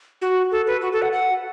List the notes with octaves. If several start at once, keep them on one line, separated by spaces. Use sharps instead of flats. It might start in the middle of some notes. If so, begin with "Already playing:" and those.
F#4
A4
B4
F#4
A4
F#5
F#5